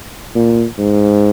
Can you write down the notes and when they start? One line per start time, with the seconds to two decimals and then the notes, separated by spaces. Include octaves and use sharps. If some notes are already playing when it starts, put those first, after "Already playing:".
0.35 A#2
0.78 G#2